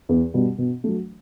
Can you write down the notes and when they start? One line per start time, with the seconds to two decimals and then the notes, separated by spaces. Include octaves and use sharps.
0.09 E2
0.34 B2 G3
0.58 B2
0.84 F#3 A3